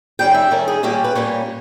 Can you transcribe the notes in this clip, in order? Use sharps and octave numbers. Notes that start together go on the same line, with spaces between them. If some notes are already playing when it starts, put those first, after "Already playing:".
D#3 G3 C#4 G5
E5
D#3 G3 C#4 A#4
G#4
A#2 G3 A#3 C#4 G4
B4
A#2 G3 A#3 C#4 C#5